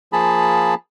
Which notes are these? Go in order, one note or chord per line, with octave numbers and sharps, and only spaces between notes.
F3 A#3 G#4 A5 B5